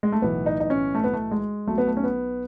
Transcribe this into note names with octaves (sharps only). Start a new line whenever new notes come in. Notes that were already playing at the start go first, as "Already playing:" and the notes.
G#3
A3
B1 A2 E3 B3
D#4
D#4
C#4
A3
B3
A3
G#3
B1 B2 A3
B3
A3
C#4
B3